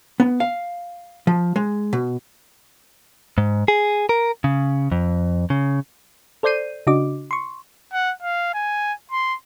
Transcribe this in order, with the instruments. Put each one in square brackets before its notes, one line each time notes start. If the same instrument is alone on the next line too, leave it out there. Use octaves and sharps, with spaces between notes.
[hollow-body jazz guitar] B3
F5
F3
G#3
B2
[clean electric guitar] G#2
G#4
A#4
C#3
F2
C#3
[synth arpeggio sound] A4 C5 D5 G6 C7 D#7
C#3 D4 F#4 D#5 D6
C6 C#6
[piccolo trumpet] F#5
F5
G#5
C6